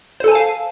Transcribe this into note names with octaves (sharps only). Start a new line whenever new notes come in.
A4 C5 F5 G#5 A5